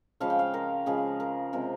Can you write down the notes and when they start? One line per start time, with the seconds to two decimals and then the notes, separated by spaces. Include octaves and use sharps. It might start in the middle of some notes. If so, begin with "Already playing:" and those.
0.20 C#3 F3 G#3 F5
0.30 G5
0.39 F5
0.54 A#4
0.86 C#3 F3 G#3 G#4
1.20 A#4
1.53 C3 F3 G#3 A#4